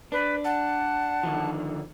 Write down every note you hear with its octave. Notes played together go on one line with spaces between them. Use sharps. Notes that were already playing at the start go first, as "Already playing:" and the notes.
D4 B4
F#5 A5
D3 D#3 F3